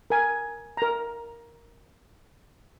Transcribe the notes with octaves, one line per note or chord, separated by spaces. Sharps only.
A#4 G#5
A#4 A#5